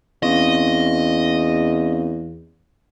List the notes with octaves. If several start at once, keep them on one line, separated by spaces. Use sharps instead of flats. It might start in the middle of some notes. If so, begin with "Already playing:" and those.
E2 C4 C#4 D#5 F5